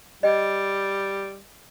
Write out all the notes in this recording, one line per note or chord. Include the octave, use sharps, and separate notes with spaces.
G3 D#5 G5